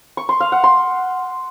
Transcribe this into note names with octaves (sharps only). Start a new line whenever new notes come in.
C#6
C6
F5
F#5
C6